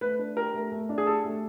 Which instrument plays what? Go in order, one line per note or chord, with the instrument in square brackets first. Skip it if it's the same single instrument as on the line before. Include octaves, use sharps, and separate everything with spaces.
[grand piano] A3 [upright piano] B4
[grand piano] D4
[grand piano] G4 [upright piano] A#4
[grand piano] A3
A3
D4
[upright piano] G#4
[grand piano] G4 [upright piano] A4
[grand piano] A3